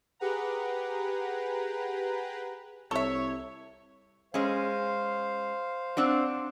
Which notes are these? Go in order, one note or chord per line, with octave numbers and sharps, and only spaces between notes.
G4 G#4 B4 F#5 A#5
C2 A4 C#5 E5
G#3 C#4 C5 F5
C4 D4 F#4